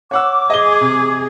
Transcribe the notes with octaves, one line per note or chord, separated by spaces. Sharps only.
C#5 F#5 D6 E6
G#4 D#5 G7
C3